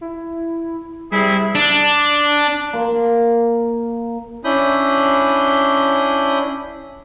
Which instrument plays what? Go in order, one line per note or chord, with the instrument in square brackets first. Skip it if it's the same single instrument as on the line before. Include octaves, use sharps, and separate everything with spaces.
[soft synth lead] E4
[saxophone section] C3 E4 G#4 [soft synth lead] G3
[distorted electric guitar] D4
[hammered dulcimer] A#3 C6
[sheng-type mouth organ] C#4 D4 E4 B5 D#6 G6